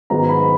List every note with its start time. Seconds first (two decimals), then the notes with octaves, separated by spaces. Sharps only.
0.10 G#2 D#3 F#3 B3 A#5
0.29 B5